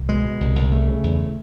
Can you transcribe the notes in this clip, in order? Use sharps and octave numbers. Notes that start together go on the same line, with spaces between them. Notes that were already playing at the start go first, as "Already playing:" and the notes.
Already playing: C2
B2 G#3
B2
C2
C2
C#3 A3
C#3
E2